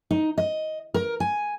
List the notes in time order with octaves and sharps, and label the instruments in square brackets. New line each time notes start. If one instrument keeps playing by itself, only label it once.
[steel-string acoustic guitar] D#4
D#5
A#4
G#5